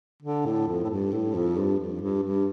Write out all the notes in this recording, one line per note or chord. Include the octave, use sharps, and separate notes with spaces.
D3
A2
F2
A2
G2
A2
F2
G2
F2
G2
G2